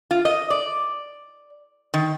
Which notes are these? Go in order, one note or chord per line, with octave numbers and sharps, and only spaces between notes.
F4
D#5
D5
D#3